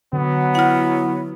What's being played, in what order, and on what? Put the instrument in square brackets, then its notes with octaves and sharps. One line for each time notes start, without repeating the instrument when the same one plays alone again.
[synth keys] D3 [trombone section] F#3 B3
[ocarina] E4 [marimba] F#5 F6